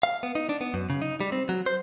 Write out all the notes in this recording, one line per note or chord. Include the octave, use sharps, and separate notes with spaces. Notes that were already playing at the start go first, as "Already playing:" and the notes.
F5
B3
D#4
D4
B3
F#2
C#3
D#4
G3
C4
F#3
C5